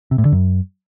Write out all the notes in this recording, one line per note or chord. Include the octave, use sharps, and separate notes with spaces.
C3
A2
D3
F#2